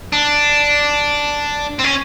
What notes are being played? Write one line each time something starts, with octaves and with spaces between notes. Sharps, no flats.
D4
C4
C#4